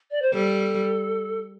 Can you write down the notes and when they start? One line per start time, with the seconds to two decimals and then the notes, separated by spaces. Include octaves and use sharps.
0.11 D5
0.22 C5
0.33 G3 A4